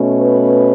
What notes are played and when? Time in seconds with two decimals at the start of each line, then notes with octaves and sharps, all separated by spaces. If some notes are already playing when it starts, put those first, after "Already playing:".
Already playing: B2 A3 C#4
0.20 B4